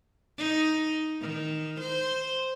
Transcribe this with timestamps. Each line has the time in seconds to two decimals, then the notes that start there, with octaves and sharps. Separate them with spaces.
0.38 D#4
1.21 D#3
1.80 C5